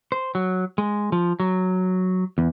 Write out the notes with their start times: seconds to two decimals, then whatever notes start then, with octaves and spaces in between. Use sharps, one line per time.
0.12 C5
0.35 F#3
0.78 G#3
1.12 F3
1.40 F#3
2.38 E2